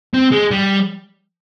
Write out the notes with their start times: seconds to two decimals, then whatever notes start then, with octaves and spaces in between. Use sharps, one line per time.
0.14 C4
0.32 G#3
0.51 G3